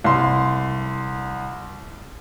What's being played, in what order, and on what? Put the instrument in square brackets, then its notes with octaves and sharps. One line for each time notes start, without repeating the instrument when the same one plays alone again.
[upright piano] C2 C6